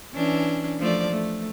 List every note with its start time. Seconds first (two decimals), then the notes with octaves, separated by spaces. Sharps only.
0.14 E3 C#4 D4
0.79 F3 A3 D5
1.12 A3